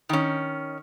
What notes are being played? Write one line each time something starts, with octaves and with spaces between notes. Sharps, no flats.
D#3 C#4